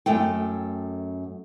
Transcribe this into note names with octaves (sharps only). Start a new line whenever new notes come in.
F#2 A3 G5